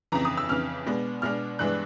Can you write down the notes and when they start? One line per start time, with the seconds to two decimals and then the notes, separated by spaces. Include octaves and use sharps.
0.12 F2 C#3 E3 A#5
0.25 D#6
0.37 E6
0.49 F2 C#3 E3 F6
0.86 B2 G#3 B3 D4
1.22 B2 G#3 B3 D4 F6
1.59 G2 E3 G#3 B3 D4 F#6